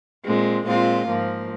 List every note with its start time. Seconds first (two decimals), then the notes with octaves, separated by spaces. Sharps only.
0.25 A#2 G#3 C4
0.66 A#2 G#3 C4 F4
1.08 G#2 F3 A#3